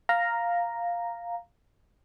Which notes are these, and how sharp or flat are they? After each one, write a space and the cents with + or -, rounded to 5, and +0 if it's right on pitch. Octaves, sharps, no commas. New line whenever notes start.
F5 +0 A#5 +0